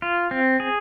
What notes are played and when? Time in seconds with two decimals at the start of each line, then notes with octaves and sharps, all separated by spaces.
0.02 F4
0.31 C4
0.60 G#4